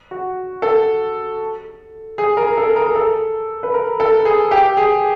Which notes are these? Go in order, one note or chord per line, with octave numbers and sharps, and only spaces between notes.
F#4
A4
G#4
A#4
A4
A#4
G#4
A4
B4
A#4
A4
G#4
G4
G#4